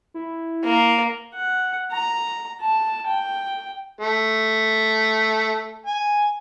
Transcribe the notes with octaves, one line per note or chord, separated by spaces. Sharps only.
E4
A#3
F#5
A#5
A5
G5
A3
G#5